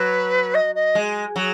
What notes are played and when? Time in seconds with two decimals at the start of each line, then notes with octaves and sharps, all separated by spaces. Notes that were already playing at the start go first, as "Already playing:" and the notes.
Already playing: F#3 B4
0.54 D#5
0.75 D#5
0.95 G#3
1.36 F#3 G#4